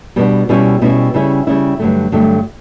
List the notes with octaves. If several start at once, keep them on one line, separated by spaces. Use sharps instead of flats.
B2 G3 B3 D4
B2 G3 C#4 E4
B2 G3 C#4 E4
C#3 G3 C#4 E4
C#3 G3 C#4 E4
G2 D3 F#3 A3
G2 D3 F#3 A3